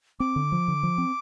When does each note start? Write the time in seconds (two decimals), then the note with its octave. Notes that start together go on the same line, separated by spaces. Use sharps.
0.20 C4 D6
0.36 D3
0.52 F3
0.68 D3
0.83 F3
0.98 C4